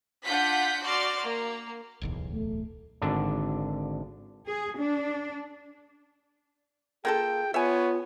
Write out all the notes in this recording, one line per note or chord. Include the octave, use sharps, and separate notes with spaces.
D4 F4 F#5 G6 B6
F#4 D5 C6 F6
A#3
D1 B1 E2
A3
G#1 D3 D4
G#4
D4
A#3 F4 G#4 A4 G5
B3 F4 C#5 E5 G#5